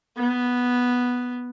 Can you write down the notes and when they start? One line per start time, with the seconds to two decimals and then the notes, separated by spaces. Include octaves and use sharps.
0.17 B3